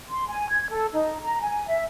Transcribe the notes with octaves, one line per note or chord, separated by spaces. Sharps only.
C6
G#5
G#6
A4
D#4
A#5
G#5
E5